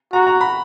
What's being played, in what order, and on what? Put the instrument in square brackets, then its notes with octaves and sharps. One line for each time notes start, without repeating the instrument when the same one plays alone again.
[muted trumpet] F#4 [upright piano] A#5
[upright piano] A#5
B5